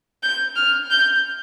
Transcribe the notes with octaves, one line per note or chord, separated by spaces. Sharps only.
G6
F6
G6